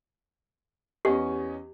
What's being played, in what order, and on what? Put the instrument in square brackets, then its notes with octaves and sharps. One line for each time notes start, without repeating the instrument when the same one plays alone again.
[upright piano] E2 C#4 D#5 [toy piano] G4